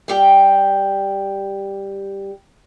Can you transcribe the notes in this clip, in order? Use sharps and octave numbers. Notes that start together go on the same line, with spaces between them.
G3 G4 G5